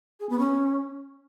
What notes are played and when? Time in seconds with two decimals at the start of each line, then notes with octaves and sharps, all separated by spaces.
0.20 G#4
0.29 B3
0.39 C#4